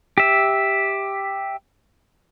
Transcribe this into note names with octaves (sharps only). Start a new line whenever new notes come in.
G4 E5